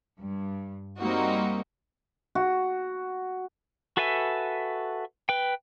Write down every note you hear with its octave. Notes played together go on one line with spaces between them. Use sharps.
G2
G3 A#3 C4 D#4 F#4
F#4
F#4 A4 B4 E5 G#5
B4 G5